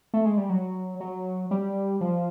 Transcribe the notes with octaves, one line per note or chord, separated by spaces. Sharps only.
A3
G#3
G3
F#3
F#3
G3
F3